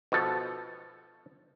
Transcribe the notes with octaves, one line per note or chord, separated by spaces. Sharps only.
B2 F3 A4